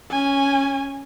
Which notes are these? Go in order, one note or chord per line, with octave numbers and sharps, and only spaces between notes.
C#4 G#5